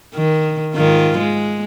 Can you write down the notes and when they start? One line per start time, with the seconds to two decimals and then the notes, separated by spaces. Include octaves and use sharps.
0.15 D#3
0.75 G#2 D#3 F4
1.18 G#3